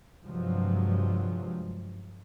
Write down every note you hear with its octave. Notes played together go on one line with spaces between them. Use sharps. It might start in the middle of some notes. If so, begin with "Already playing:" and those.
G2 C3 F3 F#3 G#3